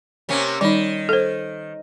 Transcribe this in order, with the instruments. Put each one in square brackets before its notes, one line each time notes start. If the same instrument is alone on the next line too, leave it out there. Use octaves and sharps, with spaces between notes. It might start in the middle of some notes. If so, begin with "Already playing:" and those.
[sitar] C3 A#3 C#4
[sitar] D#3 [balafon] G3 D#4
[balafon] A4 C5